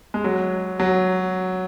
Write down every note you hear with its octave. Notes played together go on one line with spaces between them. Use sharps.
G#3
F#3
F#3